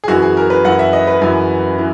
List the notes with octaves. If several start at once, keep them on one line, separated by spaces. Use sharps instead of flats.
G#4
F#2 E3 F#4
G#4
A#4
B4
F#2 E3 F#5
E5
D#5
B4
F#2 E3
E3